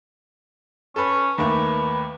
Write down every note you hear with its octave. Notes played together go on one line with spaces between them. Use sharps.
C#4 A4 B4
D#2 A3 A#3 B4